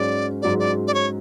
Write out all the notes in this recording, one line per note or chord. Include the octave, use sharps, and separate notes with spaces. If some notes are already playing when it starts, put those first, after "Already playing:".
Already playing: G#2 F#3 C#4 D5
G#2 F#3 C#4 G#4 D5
D5
D5
C#5